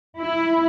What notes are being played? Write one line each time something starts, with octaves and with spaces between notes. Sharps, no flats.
E4